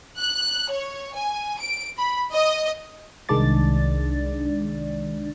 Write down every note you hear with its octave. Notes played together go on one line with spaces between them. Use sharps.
F#6
C#5
G#5
D7
B5
D#5
C2 D#3 G#3 D4 D5 A6